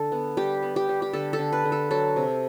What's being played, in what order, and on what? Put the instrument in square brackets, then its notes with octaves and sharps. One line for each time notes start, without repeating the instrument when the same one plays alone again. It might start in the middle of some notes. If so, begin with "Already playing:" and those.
Already playing: [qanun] D3 A4
B3
G3 G4
B3
G4
G3
G4
D3 A4
A4
D3
B4
D3
A4
F#3 A4
C3